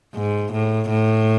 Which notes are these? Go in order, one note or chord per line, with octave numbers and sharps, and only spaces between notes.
G#2
A2
A2